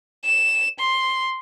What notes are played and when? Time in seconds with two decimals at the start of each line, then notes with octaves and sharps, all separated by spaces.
0.25 E7
0.79 C6